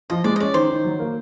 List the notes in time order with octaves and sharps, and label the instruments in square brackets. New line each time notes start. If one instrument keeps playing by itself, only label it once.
[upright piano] F3 [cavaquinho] D#5
[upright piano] G#3 [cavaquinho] D5
[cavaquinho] D#5
[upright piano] C#4 [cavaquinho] D5
[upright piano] D#3 [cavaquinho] C5
[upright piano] D#3
F#3
A#3